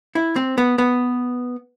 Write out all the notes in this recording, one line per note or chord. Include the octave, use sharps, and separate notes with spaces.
E4
C4
B3
B3